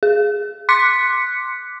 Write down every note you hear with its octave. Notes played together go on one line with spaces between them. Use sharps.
G#4
C6 D6 F#6 B6 C#7